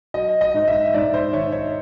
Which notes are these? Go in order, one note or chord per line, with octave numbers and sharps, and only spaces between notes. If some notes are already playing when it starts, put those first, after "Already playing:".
F#3 D#5
D#5
G#2
E5
G#2 D5
C5
D#3 C#5
C#5